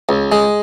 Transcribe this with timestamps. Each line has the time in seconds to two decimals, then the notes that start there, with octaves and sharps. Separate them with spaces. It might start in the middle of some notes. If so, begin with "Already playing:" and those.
0.09 C#2
0.32 G#3